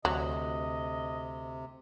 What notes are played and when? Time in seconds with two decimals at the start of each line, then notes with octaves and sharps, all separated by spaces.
0.05 D2 C3 F#3 D#5